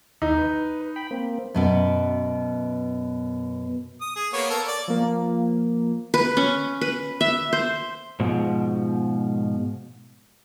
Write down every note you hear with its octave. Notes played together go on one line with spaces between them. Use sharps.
D#2 D#4
B4
G5 B5
A#3 C4
F#2 B2 B3
D#6
G#4
A#3 B3 C#5
A4 A#4
D5
F3 A#3
B4
C#4
B4
E5
C5
G#2 B2 F3